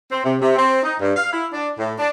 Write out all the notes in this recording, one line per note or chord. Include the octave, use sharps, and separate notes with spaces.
C4
C3
C3
C4
D#4
G2
F5
E4
D4
A2
D4